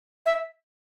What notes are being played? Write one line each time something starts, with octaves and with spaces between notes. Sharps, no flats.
E5